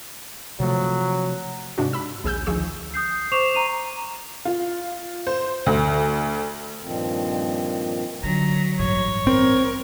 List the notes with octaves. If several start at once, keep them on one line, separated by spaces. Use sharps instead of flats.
C3 F3 F#3 A3
G#2 C3 D4 F#4
B5 E6
A#1 D#2 G#4 G#5 E6 G6
D2 D#3 F3 G#4 C#6 E6
D#6 G6 C7
C5 C#6 D6 C7 E7 F7
A#5 D#7 F7
F4
C5
D2
G2 A#2 D#3 F3 C4
D3 F#3 A#5
A1 G2 C#5
C4 A#4